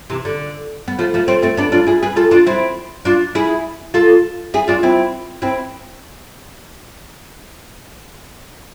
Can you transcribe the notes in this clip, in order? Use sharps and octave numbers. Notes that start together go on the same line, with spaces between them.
C3 E3
D3
B3
F3 A3
F3 A3
A3 C4
A3 C4
B3 D4
D4 F4
E4 G#4
G#4 B4
F4 A4
D4 F4
C4 E4
D4 F4
E4 G#4
F4 A4
E4 G#4
D4 F4
C4 E4
C4 E4